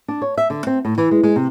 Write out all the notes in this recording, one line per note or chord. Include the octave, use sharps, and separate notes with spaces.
D4
C#5
E5
D3
C4
A2
E3
G#3
G#3
C3